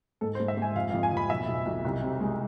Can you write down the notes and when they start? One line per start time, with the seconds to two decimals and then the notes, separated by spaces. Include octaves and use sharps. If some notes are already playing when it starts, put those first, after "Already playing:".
0.21 G#2 A4
0.35 C5
0.40 G#2
0.48 E5
0.57 G#2 G#5
0.75 F2 F5
0.90 F5
0.93 F2
1.03 G#5
1.12 F2 B5
1.30 B1 E5
1.47 B1
1.66 B1
1.85 C2
2.02 C3
2.20 G#3